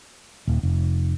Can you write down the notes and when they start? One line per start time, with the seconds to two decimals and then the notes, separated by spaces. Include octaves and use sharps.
0.47 D#1
0.63 F1